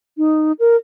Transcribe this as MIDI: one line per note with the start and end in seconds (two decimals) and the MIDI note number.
0.18 0.52 63
0.60 0.76 70